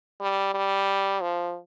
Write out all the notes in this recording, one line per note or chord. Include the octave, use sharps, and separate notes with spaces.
G3
G3
F3